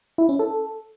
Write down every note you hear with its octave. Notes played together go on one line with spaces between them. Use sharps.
E4
C#4
A4